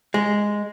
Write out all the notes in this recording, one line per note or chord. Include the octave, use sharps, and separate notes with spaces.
G#3